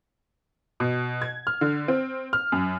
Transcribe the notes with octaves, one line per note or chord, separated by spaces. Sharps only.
B2
G#6
F6
D3
C4
F6
F#2